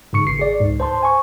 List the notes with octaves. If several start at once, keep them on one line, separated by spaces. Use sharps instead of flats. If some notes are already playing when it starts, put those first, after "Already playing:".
G#2 C#3 C#6 C#7
G#1 C7
G#4 D5
C#2 G#2
C5 A5 C6
G#5 C#6